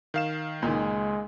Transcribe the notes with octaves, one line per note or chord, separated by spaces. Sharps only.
D#3 F5 E7
C#2 A#2 D#3 G#3